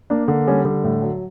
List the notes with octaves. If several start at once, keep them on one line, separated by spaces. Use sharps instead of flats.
A#3 D4
D3
G3 C#4
D3
A2
F#3